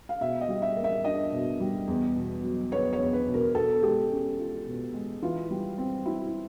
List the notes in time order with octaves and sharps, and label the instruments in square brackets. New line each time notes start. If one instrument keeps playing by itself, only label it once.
[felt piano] F5
B2 E5
D#5
G3
E5
A#3
E5
D4 D#5
B2
G3
E2
B2
F#3
B3 C#5
C#5
E2
B4
B2
A#4
B2 A4
G#3 G4
C#4
F4
B2
G#3
E3 F4
G3
C4
E4